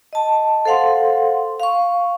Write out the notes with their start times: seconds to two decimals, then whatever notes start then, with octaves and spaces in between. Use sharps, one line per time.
0.13 D#5 A5
0.65 A4 C5 F5 F#5 C6
1.60 F5 C#6